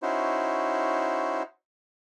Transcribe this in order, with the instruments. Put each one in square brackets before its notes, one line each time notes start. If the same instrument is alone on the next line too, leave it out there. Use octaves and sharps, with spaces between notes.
[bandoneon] C#4 D#4 E4 F#4 C5